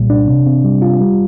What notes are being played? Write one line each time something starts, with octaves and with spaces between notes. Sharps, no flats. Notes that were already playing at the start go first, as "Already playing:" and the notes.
Already playing: C2 A#2 G3
D4
C3
C4
G3
F4
G3